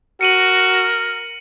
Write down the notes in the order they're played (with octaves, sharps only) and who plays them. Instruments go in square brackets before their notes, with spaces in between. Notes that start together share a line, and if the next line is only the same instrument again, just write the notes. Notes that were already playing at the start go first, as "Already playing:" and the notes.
[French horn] F#4 [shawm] A#4 [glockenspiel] C#7 D#7 F#7